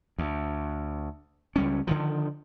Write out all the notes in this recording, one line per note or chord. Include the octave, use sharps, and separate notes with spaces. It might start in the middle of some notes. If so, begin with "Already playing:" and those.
D2
C#2 G3 C#4
D3 D#3 F3